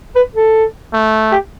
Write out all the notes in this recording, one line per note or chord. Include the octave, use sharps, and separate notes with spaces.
B4
A4
A3
G4